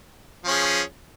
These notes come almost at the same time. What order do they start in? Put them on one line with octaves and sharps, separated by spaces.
F3 C#4 G#4